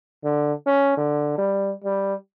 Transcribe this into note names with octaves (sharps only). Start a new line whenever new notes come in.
D3
C#4
D3
G3
G3